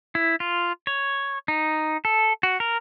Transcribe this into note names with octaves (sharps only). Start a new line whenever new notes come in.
E4
F4
C#5
D#4
A4
F#4
A#4